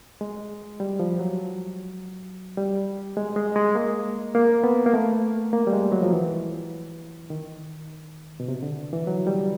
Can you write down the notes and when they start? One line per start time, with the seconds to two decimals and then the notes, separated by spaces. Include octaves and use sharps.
0.21 G#3
0.80 G3
1.00 F3
1.19 F#3
2.57 G3
3.17 G#3
3.36 G#3
3.56 G#3
3.75 A#3
4.35 A#3
4.64 B3
4.86 A#3
4.93 A3
5.53 A#3
5.67 G3
5.73 G#3
5.92 F#3
6.03 F3
6.12 E3
7.30 D#3
8.40 B2
8.48 C3
8.63 D3
8.93 E3
9.07 F#3
9.27 G3